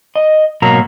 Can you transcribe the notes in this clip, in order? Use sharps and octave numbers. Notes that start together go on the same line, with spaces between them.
D#5
G#2 B2 F#3 A#3 A#5